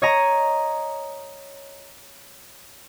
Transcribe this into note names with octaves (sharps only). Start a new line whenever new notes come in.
C#5 D#5 A#5